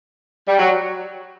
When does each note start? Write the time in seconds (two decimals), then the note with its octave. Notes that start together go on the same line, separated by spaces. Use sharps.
0.48 G3
0.59 F#3